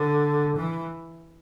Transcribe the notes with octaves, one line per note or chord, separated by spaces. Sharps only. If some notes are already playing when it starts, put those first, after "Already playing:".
Already playing: D3
E3